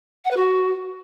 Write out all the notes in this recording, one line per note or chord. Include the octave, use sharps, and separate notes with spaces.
F#5
B4
F#4